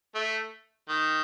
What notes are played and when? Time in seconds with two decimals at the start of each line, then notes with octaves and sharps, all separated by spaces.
0.15 A3
0.89 D#3